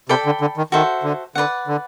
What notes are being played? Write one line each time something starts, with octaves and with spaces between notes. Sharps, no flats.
C3 A4 D5 G5 B5
D3
D3
D#3
D#3 F#4 A4 C5 E5
D3
D3 B4 D5 F#5
D3